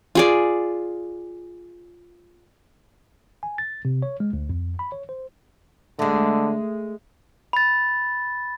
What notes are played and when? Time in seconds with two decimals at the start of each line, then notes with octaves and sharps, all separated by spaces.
0.15 F4 G#4 D5
3.43 G#5
3.58 A6
3.85 C3
4.02 C#5
4.20 G#3
4.33 D2
4.49 F2
4.79 B5
4.92 C#5
5.09 C5
5.99 D3 G#3 A3
7.53 B5 A6